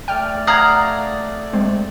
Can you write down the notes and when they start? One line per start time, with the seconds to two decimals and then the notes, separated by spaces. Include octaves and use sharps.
0.08 A3 D5 G5 F6
0.47 F5 F#5 A#5 D#6 F#6 G#6
1.53 G#3 C4